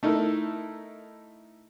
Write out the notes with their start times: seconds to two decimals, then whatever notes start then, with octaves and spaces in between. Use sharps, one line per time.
0.03 A3 D#4 E4 A#4